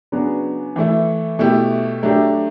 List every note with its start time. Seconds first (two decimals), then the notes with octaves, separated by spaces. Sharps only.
0.12 C#3 F#3 B3 D4 F#4
0.76 E3 A3 E4
1.39 B2 A3 E4 G4
2.03 F#3 A3 D4 G4